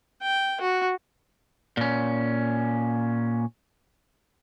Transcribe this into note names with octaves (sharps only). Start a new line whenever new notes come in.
G5
F#4
A#2 C#4